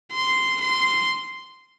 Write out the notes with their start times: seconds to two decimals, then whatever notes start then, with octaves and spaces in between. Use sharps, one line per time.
0.12 C6
0.61 C6